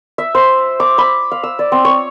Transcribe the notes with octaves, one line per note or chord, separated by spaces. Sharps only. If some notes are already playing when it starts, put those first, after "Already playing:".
E5
C5
D6
B5
F5
E6
D5
C4
C#5